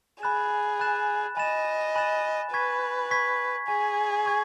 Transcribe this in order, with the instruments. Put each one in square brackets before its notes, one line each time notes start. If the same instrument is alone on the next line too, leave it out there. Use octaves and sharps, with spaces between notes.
[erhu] G#4 [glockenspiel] G#5 B5 F#6 A6 E7
[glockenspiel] G#5 B5 F#6 A6 E7
[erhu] D#5 [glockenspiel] G#5 B5 F#6 A6 E7
[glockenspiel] G#5 B5 F#6 A6 E7
[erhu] B4 [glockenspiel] G#5 C#6 G#6 B6
[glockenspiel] G#5 C#6 G#6 B6
[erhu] G#4 [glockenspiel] G#5 C#6 G#6 B6
[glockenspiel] G#5 C#6 G#6 B6